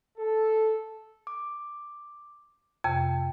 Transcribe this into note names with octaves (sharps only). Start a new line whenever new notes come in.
A4
D6
F2 C3 G5